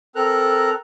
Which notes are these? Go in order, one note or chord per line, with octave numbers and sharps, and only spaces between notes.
C4 A4 A#4 A#5 F#6